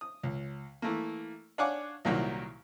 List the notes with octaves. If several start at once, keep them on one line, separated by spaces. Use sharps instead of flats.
D#6
C#2
E3 A3 A#3
D4 C#5 F5 F#5 G#5 D6
C2 A#2 D#3 F#3 A#3 E4